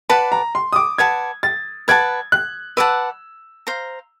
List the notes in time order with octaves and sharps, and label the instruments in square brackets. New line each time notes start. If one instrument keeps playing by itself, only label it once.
[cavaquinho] B4 D5 F#5 A5 [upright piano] B5
[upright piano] A#5
C6
D#6
D6
[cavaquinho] B4 D5 F#5 A5 [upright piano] G#6
[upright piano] A6
[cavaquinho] B4 D5 F#5 A5 [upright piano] G#6
[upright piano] F#6
[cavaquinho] B4 D5 F#5 A5 [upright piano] E6
[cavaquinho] C5 F5 A#5